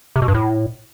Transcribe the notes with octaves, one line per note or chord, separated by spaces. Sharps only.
C3
B2
G2
A2